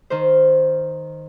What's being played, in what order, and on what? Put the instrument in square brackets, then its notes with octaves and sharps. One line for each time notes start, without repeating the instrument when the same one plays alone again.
[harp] D#3 C5